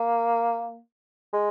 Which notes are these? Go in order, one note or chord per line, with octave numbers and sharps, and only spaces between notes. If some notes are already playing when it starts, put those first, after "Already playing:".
Already playing: A#3
G#3